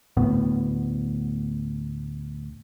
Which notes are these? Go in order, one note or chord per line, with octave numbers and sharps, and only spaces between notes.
D2 A2 B3